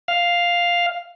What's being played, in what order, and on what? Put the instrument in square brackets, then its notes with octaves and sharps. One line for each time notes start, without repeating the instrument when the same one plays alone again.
[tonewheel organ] F5